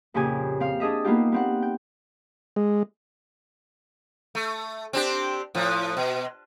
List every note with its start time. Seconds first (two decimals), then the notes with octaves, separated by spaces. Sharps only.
0.14 F2 A#2 C#3 G4 G#5
0.60 C4 F5
0.80 D4 G#4 D#5 E5
1.04 A#3 B3 D#4 F4 G4
1.32 B3 C4 F#5
1.62 G5
2.56 G#3
4.35 A3
4.93 C4 D4 G4
5.55 A2 F3
5.97 B2